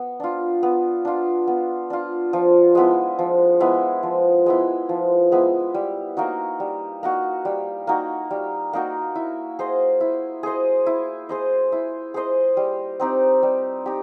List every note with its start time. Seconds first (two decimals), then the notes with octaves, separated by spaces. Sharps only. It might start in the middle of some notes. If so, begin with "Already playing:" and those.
Already playing: B3
0.20 D4 F4
0.63 B3
1.05 D4 F4
1.47 B3
1.90 D4 F4
2.33 F3
2.75 G#3 B3 E4
3.19 F3
3.60 G#3 B3 E4
4.03 F3
4.46 G#3 B3 E4
4.89 F3
5.32 G#3 B3 E4
5.74 G3
6.17 A#3 D#4 F#4
6.60 G3
7.03 A#3 D#4 F#4
7.45 G3
7.87 A#3 D#4 F#4
8.31 G3
8.73 A#3 D#4 F#4
9.16 E4
9.59 G#4 C5 D#5
10.01 E4
10.43 G#4 C5 D#5
10.86 E4
11.29 G#4 C5 D#5
11.72 E4
12.14 G#4 C5 D#5
12.57 G3
13.00 C4 D#4 G4
13.43 G3
13.86 D#4 G4